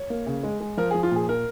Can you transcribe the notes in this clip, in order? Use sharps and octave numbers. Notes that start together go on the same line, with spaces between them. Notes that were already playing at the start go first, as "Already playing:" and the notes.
Already playing: C#5
A#3
C#3
G#3
G#3
F3 A#4
F3 G#4
F4
A#2 G#4
A#4